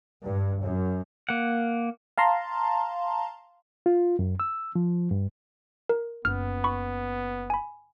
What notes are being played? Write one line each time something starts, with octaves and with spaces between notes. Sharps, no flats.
G2
F#2
A#3 F#5
F5 A5 A#5 C6
F4
F#2
E6
F3
G2
A#4
F#1 B3 F6
B5 C#6
G#5 B5